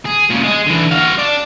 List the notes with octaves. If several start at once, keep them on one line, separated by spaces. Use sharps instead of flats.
G#4
A#2 C#3
G#3 G#4
D3 E3
F#4 F5
D4 D5